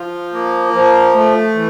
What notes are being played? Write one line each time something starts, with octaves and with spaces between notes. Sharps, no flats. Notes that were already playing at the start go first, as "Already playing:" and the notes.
Already playing: F3
A#3
F3
A3
E3